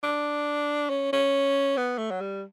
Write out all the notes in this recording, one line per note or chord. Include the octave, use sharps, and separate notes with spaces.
D4
C#4
C#4
B3
A3
F#3
G3